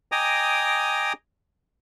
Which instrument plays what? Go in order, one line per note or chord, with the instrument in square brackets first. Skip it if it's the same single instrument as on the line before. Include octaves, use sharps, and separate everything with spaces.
[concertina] D#5 G5 G#5 A#5 D6 D#6